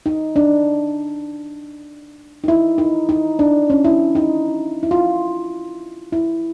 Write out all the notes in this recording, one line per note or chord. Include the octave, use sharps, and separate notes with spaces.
D#4
D4
D#4
E4
D#4
D#4
D4
C#4
E4
D#4
E4
F4
E4